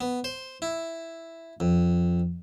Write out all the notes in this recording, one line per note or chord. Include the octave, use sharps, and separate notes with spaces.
B3
C5
E4
F2